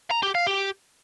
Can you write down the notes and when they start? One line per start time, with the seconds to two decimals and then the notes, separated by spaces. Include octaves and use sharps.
0.11 A#5
0.23 G4
0.35 F5
0.47 G4